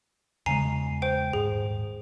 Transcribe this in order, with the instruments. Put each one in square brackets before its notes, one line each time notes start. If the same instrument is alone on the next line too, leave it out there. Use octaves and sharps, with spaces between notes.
[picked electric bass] E2 C#3 G#3 [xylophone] G#5 A#5 C7
[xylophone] C5 G5
[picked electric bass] D#1 G#2 [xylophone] G#4